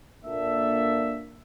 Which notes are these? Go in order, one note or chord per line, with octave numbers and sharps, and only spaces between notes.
A#2 A#3 D4 A4 E5